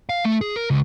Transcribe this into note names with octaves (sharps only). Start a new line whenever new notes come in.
F5
A3
G#4
A#4
C#2